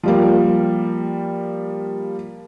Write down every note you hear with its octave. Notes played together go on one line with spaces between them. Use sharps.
F3 G3 A#3